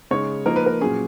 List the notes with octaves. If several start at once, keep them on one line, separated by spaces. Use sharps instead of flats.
C#3 G#3 D#4 C#5
F3 A#3 D#4 A#4
B4
A#4
A#2 F#3 C#4 G#4